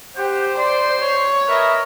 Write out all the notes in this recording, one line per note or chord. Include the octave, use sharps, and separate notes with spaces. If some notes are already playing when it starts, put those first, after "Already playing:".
G4 C5 F#5
D5 C6
C#5
A#4 B4 D#5 E5